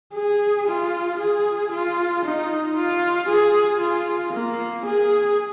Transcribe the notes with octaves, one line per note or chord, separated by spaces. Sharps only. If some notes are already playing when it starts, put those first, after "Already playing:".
G#4
F4
G#4
F4
D#4
F4
G#4
F4
A#3
G#4